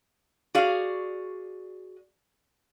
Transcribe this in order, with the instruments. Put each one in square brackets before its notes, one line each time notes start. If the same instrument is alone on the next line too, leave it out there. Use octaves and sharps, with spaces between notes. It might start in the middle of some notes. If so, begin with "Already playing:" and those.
[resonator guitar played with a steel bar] F#4 G#4 D5 F5